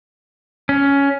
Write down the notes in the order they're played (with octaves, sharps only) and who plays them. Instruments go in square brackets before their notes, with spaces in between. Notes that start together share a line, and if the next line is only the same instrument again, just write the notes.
[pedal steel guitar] C#4